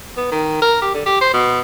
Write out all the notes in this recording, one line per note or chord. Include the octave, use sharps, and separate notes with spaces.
B3
D#3
A#4
G4
D3
G4
C5
B2